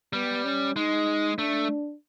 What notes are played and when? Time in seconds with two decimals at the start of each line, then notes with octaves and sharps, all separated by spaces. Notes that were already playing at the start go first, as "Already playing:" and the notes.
0.13 G3 B3
0.44 C#4
0.76 G#3 D#4
1.38 A3 D4